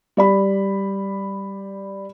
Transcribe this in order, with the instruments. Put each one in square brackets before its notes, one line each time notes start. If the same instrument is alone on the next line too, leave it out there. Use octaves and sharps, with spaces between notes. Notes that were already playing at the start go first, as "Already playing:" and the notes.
[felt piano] G3 D5 B5